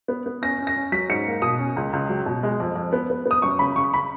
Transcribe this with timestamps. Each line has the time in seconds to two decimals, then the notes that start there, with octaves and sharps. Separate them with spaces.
0.08 B3
0.26 B3
0.42 C#4 A#6
0.59 C#4
0.67 A#6
0.76 C#4
0.92 F#3 B6
1.09 G#2 C#7
1.26 A#3
1.42 B2 D#6
1.59 C#4
1.77 C#2
1.93 C#2
2.09 F#3
2.26 B2
2.43 G#3
2.60 F2
2.76 F2
2.93 B3
3.10 B3
3.26 B3
3.31 D#6
3.42 F#2 C#6
3.59 C#3 B5
3.76 C#3 C#6
3.94 B5